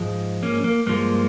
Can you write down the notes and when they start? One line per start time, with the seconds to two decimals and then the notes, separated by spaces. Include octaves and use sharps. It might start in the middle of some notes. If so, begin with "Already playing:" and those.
Already playing: G#2 F3 G#3
0.43 A#3 C#4
0.64 A#3
0.86 G2 F3 G#3 A#3